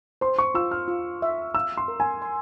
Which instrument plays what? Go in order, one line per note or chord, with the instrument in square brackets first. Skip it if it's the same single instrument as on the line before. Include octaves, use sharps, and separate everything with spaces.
[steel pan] C5 [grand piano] C6
[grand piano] C#6
[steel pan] F4 [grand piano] E6
[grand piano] F6
[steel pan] F4
E5
[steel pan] F5 [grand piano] E6
[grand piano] C6
[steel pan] A#4
[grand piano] G#5
[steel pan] C6